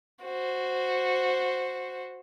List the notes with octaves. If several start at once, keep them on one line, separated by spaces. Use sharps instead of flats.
F#4 C5